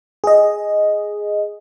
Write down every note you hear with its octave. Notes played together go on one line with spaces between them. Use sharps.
G#4 D#5